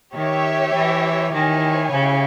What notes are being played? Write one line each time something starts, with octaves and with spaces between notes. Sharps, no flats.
D#3 G4 C#5 E5
E3
D#3 E4 G4 C#5 G#5
C#3